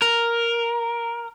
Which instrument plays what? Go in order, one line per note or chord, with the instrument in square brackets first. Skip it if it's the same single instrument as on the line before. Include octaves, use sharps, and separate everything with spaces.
[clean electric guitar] A#4